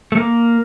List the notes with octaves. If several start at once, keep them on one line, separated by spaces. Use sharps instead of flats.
A3
A#3